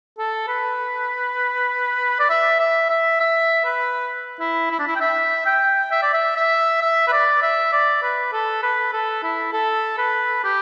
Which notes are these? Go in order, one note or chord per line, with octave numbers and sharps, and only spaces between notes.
A4
B4
D5
E5
E5
E5
E5
B4
E4
E4
D4
E4
G5
E5
G5
E5
D5
E5
E5
E5
B4
D5
E5
D5
B4
A4
B4
A4
E4
A4
B4
G4